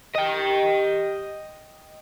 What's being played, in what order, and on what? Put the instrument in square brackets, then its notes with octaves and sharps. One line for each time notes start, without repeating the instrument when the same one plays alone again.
[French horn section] G4 [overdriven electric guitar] D#5 G5